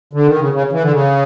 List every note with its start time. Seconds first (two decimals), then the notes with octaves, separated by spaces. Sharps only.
0.13 D3
0.26 D#3
0.39 C#3
0.53 C#3
0.72 E3
0.82 D3
0.91 C#3